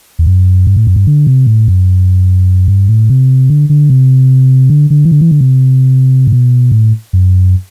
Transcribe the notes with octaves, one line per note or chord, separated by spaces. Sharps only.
E2
F#2
G2
A2
F#2
G2
D3
C3
A2
F#2
G2
A2
C3
D3
D3
C3
D3
D3
E3
D3
E3
D3
C3
A2
B2
A2
F#2